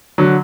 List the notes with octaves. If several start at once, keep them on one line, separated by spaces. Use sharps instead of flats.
D3 F#3